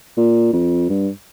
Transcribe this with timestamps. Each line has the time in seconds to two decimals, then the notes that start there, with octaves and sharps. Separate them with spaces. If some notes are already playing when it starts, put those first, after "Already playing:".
0.17 A#2
0.53 F2
0.90 G2